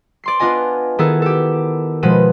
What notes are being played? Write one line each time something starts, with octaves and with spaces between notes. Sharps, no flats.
D5 C6 C7
B3 D4 F4 D#5 G#5
D#3 B3 E4 G#4 A4
G4 A4
B2 F3 G#3 B4 D#7